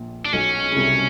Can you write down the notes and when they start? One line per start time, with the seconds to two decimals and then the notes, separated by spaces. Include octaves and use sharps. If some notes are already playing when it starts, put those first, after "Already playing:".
Already playing: A#1 A#2
0.25 D4
0.32 B1 B2 C#4
0.71 C#3
0.76 C2 C3